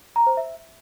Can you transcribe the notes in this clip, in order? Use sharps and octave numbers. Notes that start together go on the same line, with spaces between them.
A#5
C5
E5